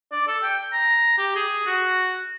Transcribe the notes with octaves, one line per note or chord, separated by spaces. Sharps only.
D5
A4
G5
A#5
G4
G#4
F#4